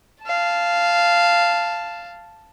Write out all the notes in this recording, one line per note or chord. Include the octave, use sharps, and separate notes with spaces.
F5 A5